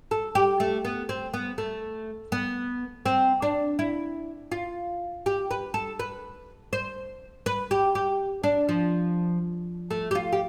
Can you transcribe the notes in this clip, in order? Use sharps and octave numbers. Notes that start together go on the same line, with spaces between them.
A4
G4
A3
B3
C4
B3
A3
B3
C4
D4
E4
F4
G4
B4
A4
B4
C5
B4
G4
G4
D4
F3
A3
G4
F4
G4